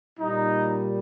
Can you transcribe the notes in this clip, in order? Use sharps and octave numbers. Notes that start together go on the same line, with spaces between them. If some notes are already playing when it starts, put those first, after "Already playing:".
A#2 G3 D#4